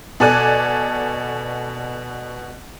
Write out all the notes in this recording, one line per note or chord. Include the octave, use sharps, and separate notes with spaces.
B2 A4 D5 G#5 F#6